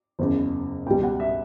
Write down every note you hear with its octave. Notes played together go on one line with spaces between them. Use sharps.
F#1 E2 C#3
C#2 B2 G3 G5
F#5
E5